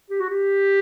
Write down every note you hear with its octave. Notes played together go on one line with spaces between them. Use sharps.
G4
F#4
G4